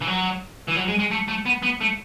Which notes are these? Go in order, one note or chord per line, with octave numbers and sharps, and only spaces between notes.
E3
F#3
E3
F#3
G#3
G#3
A3
A3
B3
B3
A3